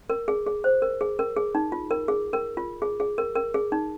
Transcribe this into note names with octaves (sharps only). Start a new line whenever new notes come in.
A#4
G#4
G#4
C5
A#4
G#4
A#4
G#4
D#4
F4
A#4
G#4
A#4
F4
G#4
G#4
A#4
A#4
G#4
D#4